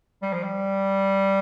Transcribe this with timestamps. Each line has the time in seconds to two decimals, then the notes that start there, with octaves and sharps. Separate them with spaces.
0.22 G3
0.33 F3
0.43 G3